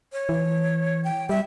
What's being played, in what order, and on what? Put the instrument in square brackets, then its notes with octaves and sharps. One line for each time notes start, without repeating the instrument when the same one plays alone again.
[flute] C#5
[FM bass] E3
[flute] G5
[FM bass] G3 [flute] E5